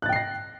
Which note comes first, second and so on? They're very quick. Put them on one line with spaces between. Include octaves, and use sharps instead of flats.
F#6 A6 G5 C7 A#6